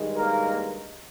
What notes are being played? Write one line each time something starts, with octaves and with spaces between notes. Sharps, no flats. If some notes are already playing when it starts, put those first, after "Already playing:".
Already playing: G2 D#3 G#3
A#3 A#4